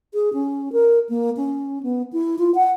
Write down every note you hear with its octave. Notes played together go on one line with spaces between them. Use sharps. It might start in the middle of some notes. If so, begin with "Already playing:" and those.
G#4
C#4
A#4
A#3
C#4
B3
E4
F4
F#5